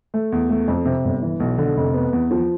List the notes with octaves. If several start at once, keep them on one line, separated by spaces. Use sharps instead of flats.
A3
E2
A3
F2
C3
G1
E3
B1
D3
F1
B3
E2
F3